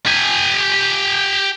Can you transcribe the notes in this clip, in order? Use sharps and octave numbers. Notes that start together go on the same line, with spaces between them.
G4 G#5